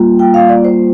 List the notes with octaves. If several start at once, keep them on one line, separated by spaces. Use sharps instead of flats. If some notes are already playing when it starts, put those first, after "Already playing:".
Already playing: G3 A#3 F4
G5
F5
D5
C5